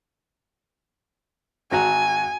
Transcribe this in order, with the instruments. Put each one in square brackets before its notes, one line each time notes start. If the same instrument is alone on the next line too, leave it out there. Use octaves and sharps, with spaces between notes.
[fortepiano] G#1 F#4 A#5 [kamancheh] G#5